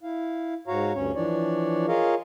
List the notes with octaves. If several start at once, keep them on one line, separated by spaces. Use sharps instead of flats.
E4 F5
G#2 F#4 C#5 F5 A#5
D2 G2 C#4 C#5
E3 F3 D4 C#5 D5
F4 G#4 A#4 C#5 D#5 F5